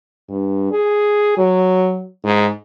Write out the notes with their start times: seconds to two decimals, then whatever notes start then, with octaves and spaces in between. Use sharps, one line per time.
0.30 G2
0.71 G#4
1.38 F#3
2.24 G#2